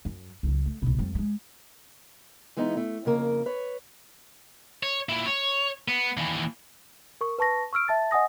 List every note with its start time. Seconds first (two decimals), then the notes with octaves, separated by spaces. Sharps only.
0.05 F#2
0.43 C#2 F#3
0.66 A3
0.82 C2 B2
0.98 F2 G3
1.15 G3 G#3
2.57 E3 G#3 B3 D#4
2.77 A3
3.05 F2 C#3 A#3 A#4
3.46 B4 C#5
4.83 C#5
5.09 A#2 E4
5.26 C#5
5.88 B3
6.17 D#2 E3
7.21 A#4 C#6
7.39 B4 A5 C#6 A#6
7.73 C#6 E6 F6 D7
7.88 E5 A5 A6
8.11 D#5 F#5 G#5 D#6 A#6